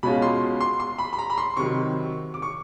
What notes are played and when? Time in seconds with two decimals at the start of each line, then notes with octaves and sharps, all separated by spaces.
0.03 B2 G#3 C#4 F4 B5
0.22 C6
0.61 C6
0.80 C6
0.99 B5
1.13 B5
1.19 A#5
1.30 B5
1.38 C6
1.57 C3 D#3 F#3 C#6
2.34 D6
2.42 C#6